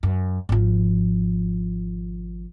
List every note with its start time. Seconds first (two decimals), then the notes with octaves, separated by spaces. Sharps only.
0.03 F#2
0.49 G#1 F3